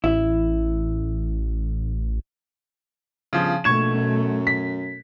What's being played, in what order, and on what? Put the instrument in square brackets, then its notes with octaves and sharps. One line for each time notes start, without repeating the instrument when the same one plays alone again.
[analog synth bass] A1 [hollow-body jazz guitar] E4
[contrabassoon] G1 [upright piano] C#3 F3
[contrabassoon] A#1 [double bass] B2 A3 [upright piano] C#6 G#6 E7
[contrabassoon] F#2
[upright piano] B6